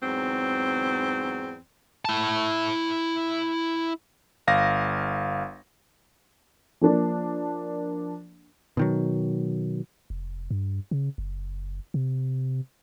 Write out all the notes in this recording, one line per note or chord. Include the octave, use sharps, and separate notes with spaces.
E2 G#2 F#3 C4
E4 A5
G1 F5 A#6
F3 A#3 D4
B2 D#3 F#3
F1
G2
C#3
F#1
C3